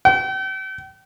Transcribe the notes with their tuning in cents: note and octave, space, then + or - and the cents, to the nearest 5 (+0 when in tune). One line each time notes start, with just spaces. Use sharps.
G5 -40